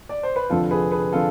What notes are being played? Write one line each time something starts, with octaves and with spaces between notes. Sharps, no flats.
D5
C5
B4
F1 F2 D3 F3 F4 A4
G#4 B4
G#4 B4
D3 F3 F4 A4